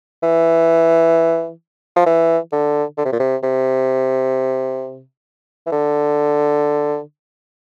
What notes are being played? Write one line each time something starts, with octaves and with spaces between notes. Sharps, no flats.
E3
F3
E3
D3
D3
C3
A#2
C3
C3
E3
D3